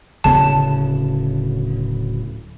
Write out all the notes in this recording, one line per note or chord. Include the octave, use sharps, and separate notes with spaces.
D1 C#3 B3 A5